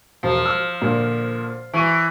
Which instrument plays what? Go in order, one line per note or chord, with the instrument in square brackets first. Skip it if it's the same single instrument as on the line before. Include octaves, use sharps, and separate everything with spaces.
[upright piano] E1 [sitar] F3
[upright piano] E6 F6
A#2 D3
[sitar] E3 [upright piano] C#6 D#7